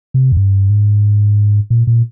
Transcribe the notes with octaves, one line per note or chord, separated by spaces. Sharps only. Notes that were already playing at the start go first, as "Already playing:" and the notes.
C3
F2
G2
G#2
A#2
A#2